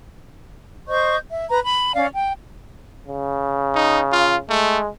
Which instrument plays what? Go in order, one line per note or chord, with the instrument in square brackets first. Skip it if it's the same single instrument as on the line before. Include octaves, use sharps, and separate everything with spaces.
[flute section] C5 D#5 C#6 G6
E5
B4 A#5
B5
C#4 D5 F5
G5
[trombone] C#3
[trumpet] D#4
F4
[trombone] G#3 [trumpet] A3